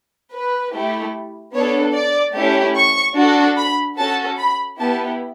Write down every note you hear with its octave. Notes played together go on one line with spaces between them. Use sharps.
B4
A3 E4 G4
B3 D4 A4 C#5
D5
A3 C#4 E4 G4
C#6
D4 F#4 A4
B5
C#4 F#4 A4 A5
B5
B3 E4 G4 A5